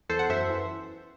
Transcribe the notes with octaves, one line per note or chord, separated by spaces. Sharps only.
E2 A4 C5
F#5
F#2 C5 E5
E3